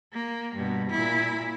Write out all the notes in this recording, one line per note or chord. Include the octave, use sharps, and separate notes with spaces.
A#3
G2 B2
A#2 E4